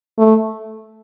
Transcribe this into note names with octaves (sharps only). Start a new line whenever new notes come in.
A3